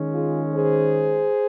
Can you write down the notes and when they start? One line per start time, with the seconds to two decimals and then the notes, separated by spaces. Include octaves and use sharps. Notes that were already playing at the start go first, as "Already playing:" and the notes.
Already playing: D#3 G#3 C#4
0.13 F4 G#4
0.53 G#4 C5